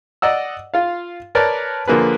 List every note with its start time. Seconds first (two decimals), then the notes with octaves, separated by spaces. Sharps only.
0.22 D5 D#5 F#5 E6
0.74 F4 F5
1.35 A#4 B4 C#5 D5 A5
1.88 D3 F3 A#3 G#4 B4